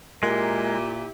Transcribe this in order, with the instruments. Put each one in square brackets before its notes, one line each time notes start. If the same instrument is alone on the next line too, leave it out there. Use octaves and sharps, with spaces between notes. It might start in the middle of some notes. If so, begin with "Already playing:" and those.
[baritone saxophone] A#2 [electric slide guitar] G#3 [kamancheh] E4 G4 [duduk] A#4